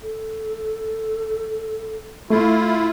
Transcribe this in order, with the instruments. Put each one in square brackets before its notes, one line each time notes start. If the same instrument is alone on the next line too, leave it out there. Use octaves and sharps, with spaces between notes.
[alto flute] A4
[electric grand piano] A3 [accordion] E4 F4